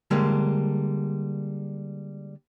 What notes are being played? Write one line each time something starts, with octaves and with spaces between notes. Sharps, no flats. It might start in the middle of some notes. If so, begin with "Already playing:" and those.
D3 G3 G#3 A#3